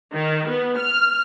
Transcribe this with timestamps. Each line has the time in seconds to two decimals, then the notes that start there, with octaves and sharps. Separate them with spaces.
0.14 D#3
0.49 B3
0.79 F6